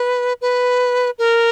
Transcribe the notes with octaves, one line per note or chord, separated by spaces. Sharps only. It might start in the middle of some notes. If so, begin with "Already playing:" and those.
Already playing: B4
B4
A#4